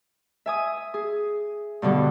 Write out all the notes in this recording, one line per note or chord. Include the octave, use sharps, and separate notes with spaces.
E5 G#5 D#6
G#4
G2 B2 D3 G3